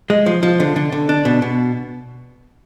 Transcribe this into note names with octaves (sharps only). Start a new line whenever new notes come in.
G#3
F3
F3
D3
D3
D3
D4
B2
B2